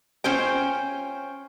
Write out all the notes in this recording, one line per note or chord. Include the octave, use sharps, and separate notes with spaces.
C#4 F4 C5 G5